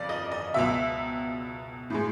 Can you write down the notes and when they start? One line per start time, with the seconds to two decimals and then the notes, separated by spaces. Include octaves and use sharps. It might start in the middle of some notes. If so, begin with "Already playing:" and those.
Already playing: F2 C#3 D5
0.09 D#5
0.32 D#5
0.54 C#2 B2 F#3 E5
1.90 A2 E3 G#3